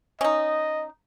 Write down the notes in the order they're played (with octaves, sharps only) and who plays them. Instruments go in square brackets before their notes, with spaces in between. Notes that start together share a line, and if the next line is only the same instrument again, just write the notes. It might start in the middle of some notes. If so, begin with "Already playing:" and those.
[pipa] C#4 D#4 [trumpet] D#5